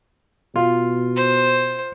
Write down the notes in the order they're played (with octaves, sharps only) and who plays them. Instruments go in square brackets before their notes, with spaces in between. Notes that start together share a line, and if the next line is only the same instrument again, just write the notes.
[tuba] B2 [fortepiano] F4
[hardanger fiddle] C5